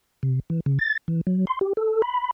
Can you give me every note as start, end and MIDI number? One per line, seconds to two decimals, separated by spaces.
0.23 0.40 48
0.50 0.60 52
0.66 0.79 49
0.79 0.97 93
1.08 1.21 52
1.27 1.45 54
1.47 1.59 84
1.61 1.73 67
1.77 2.02 69
2.02 2.31 83